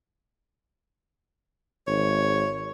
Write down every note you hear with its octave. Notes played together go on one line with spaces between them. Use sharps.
G#1 C#5